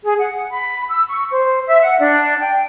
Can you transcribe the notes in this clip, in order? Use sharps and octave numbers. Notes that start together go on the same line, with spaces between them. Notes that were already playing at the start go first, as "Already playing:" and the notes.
G#4
F#5
B5
E6
C#6
C5
E5
F#5
D4
G5